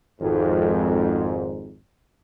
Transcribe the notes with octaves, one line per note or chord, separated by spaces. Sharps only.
G#1 F2 G#2